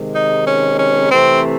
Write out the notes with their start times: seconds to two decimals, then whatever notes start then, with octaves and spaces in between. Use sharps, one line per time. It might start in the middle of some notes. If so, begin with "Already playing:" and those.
Already playing: C3 D#3 G#3
0.15 D#4
0.47 C#4
0.79 C#4
1.11 C3 E3 A3 C4